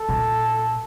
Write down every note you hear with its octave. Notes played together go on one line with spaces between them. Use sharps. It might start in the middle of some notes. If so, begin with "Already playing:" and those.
Already playing: A4
A#2